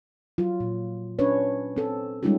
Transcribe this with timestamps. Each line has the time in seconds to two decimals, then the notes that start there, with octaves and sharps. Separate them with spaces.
0.38 F#3 F4
0.60 A#2
1.19 C#4 D4 B4 C#5
1.76 C4 A4
2.23 G3 G#3 C#4 D#4 F4 G4